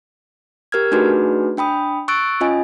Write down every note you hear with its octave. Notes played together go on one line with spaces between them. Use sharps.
G4 A#4 F6 G#6
A3 D4 D#4 F#4 G#4 B4
D4 G5 B5 D#6
C#6 E6 F#6 A6 D7
C#4 F4 D#5 G#5